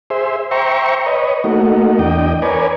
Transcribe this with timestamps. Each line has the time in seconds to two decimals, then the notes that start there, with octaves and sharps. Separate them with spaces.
0.10 G#4 C5 E5
0.51 C5 E5 G5 A#5 C#6
1.06 B4 C#5 D#5
1.44 A3 A#3 D#4 F#4
1.99 E2 D4 D#5 G5
2.42 A#4 B4 C#5 D5 G#5